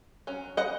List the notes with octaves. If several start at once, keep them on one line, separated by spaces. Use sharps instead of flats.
F#3 C#4
D#5 F#5